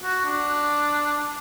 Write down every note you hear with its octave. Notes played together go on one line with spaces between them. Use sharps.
F#4
D4